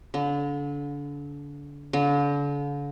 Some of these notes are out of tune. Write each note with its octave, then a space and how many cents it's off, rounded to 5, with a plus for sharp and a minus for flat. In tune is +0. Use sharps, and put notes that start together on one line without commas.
D3 -35
D3 -40